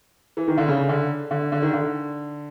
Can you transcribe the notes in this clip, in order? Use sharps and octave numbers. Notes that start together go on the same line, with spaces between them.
E3
D#3
D3
C#3
D3
D3
D3
D#3
D3